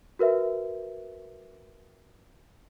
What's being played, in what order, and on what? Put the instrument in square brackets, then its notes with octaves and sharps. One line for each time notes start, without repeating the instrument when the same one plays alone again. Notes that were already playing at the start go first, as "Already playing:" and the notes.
[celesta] F#4 A#4 B4 E5